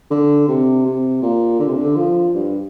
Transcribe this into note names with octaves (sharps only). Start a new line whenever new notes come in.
D3
C3
C3
A#2
D3
C3
D3
F3
G2